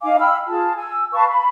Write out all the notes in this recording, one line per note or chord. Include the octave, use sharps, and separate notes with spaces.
D#4 F5 G#5 D6
G5 B5 E6 F6
F4 G#4 A5
G#5 E6
B4 F5 A5 C#6
B5